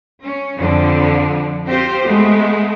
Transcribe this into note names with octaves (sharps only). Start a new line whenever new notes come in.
C#4
F2 D3 F3
C4 F4 G4 C5
G#3 A3 B3